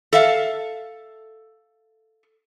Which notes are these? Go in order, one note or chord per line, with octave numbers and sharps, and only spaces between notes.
A4 E5 F5